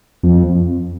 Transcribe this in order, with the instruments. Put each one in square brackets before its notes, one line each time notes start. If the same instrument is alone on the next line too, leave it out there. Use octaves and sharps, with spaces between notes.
[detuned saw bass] F2